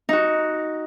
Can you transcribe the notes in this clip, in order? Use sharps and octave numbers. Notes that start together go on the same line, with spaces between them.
D#4 F#4